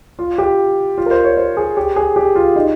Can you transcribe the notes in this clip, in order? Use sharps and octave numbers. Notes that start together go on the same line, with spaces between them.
F4
G4
F4
A#4
C5
C#5
C5
G#4
G4
G#4
G4
F4
D#4